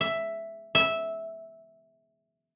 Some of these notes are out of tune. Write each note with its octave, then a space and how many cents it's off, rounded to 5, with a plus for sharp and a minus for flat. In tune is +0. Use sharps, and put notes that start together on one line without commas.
E5 +5
E5 -10